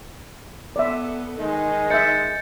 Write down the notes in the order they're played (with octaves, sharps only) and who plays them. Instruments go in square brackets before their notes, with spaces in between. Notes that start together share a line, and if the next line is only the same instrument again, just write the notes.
[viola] B3 A4 [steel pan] D5 E5
[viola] D#3 D#4 [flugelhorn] G#3
[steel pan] D#5 E5 [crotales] G6 A6 C#7